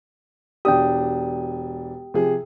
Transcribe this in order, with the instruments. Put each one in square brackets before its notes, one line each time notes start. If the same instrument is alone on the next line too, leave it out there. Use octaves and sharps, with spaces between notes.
[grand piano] E1 D4 D#6 [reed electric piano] G4 G5
[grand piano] C3 F3 G#4